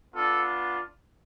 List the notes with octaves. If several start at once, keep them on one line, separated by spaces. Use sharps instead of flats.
B3 D4 F4 A4